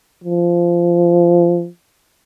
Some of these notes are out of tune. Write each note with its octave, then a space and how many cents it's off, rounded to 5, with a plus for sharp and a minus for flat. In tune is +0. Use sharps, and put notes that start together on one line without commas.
F3 -15